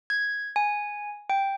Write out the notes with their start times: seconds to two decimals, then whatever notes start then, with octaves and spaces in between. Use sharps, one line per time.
0.10 G#6
0.56 G#5
1.30 G5